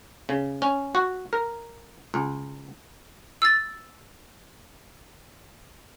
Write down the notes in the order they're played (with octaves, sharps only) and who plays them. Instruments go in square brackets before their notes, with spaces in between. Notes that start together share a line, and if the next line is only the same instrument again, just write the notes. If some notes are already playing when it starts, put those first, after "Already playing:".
[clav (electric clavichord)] C#3
C#4
F#4
A#4
C#2
[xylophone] E6 A6